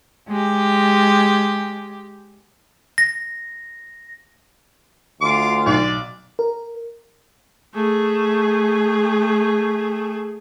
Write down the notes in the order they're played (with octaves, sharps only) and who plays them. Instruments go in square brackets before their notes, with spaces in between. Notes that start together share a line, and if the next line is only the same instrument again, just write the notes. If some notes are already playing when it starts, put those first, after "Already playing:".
[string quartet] G#3 G4
[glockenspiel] A#6
[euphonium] D2 [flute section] F4 C6 [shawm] D6
[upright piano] B1 [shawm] D5
[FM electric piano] A#4
[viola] A3 G#4